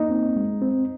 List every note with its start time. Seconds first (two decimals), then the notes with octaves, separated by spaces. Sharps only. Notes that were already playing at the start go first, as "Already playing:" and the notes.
Already playing: A#3 D#4
0.10 C4
0.36 G#3
0.62 C4